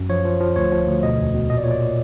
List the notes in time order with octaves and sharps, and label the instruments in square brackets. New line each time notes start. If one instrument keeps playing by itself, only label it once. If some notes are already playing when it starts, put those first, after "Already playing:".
Already playing: [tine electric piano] F#2
F3 C#5
F3
F3
D2 C#5
F3
D2
B2 D#5
E2
B2
A#2 D#5
D5
A#2 C#5
D5
A#2